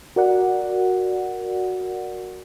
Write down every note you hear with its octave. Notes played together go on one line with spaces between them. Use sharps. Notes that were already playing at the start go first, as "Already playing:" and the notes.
F#4 A#4 D5 F#5